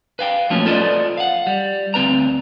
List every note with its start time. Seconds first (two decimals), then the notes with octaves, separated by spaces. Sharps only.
0.19 B4 F5 G5
0.50 F3 F#3 A3 A#3 C#4
0.66 F4 A4 B4 C5 D5 D#5
1.17 F5 F#5
1.47 G3
1.94 D2 C4 B4 A#5